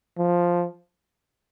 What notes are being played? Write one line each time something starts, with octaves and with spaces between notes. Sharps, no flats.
F3